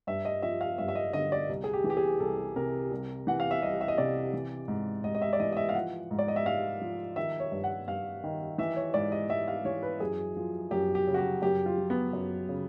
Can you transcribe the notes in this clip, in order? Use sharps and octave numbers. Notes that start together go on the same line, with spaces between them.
G2 E5
D#5
F3 E5
F5
G2 E5
E5
D#5
D3 D#5
D5
C2
G#4
G4
E3
G4
G#4
C2 A4
C3 A#4
C2
E3 F#5
F5
E5
C2 D#5
E5
D#5
C3 D5
E3
G#2
G#2 D#5
D#5
E5
D5
E3 D#5
D#5
E5
F5
F3 F#5
G#2
D5
D#5
E5
G#2 F5
F3
D#3 E5
C#5
G2
F#5
G2 F5
D#3
E3 E5
C#5
G#2 D5
D#5
G#2 E5
F5
E3 C#5
B4
F#2 G#4
F3
F#2 G4
G4
C#3
F#4
G4
F#2 G4
F4
F3
B3
F#2
C#3